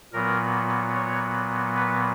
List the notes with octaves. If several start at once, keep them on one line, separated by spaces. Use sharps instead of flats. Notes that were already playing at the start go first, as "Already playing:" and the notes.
A#2 F#3 B3 A#4
C#5
B4